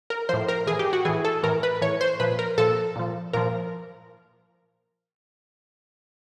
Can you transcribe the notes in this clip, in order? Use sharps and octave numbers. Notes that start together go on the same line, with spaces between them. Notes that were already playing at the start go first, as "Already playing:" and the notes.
A#4
A2 F3 C5
A#4
A2 E3 G#4
G4
F#4
A2 E3 G#4
A4
A2 E3 A#4
B4
A2 E3 C#5
C5
A#2 F3 B4
A#4
A#2 F3 A4
A#2 F3
A#2 F3 A#4